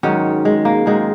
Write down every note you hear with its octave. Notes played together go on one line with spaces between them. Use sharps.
G#2 D#3 F#3 C#4
G#3
A#3
G#2 D#3 F#3 G#3